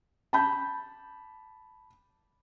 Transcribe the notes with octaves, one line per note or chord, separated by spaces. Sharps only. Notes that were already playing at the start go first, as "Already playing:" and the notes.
A5 B5 G6